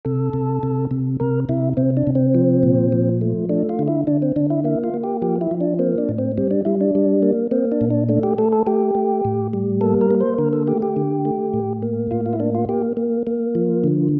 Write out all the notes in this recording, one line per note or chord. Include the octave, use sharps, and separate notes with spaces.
C3 A4
C3
C3
C3
C3 A#4
C3 E4
C3 C4
D4
C3
C4
F3
A#2
F3
A3
A3 D4
F4
D3
E4
D3 D4
C4
D3 D4
E4
A#3 E4
F4
A#3
G4
F3 G4
E4
F3
D4
A#3 C4
D4
A2
C4
G3 C4
D4
G3 E4
D4
G3
A#3
A#3 C4
D4
A#2
D4
A3 D4
G4
A3 A4
A4
A3 G4
A3
A2
G3
A#3 A4
A#4
A#3
C5
D3 A#4
A4
A3 G4
G4
D3
A3
A2
A#3
A2 F4
F4
E4
A#3 D4
F4
A#3 G4
A#3
A#3
F3
D3